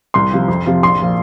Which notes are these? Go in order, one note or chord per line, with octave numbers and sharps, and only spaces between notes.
C2 C6
C3 F3
F2
C3 F3
A#1 C6
A#2 F3